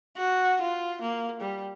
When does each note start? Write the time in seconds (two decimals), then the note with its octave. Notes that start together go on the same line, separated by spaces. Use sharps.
0.17 F#4
0.61 F4
1.02 A#3
1.41 G3